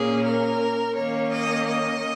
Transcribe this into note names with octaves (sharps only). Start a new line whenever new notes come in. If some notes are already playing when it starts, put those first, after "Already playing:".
Already playing: A#2 A#3 C#4 G#4
A#4
D#3 A#3 C#4 C#5
D#5
D#5